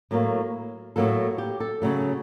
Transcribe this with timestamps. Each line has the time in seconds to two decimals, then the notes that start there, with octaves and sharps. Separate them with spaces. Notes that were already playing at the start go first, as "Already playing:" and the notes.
0.11 A2 F#3 A#3
0.96 A2 F#3 A#3 A4
1.38 G4
1.60 A4
1.82 C#3 F#3 A3